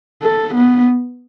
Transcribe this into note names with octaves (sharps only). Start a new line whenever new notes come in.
A4
B3